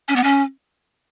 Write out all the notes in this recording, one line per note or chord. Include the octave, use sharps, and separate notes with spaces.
C#4
B3
C#4